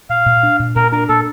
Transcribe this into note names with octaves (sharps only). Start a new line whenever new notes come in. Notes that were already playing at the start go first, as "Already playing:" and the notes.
A#2 F5
A#2
D4
A#2
A#2 A#4
D4 A#4
A#2 A4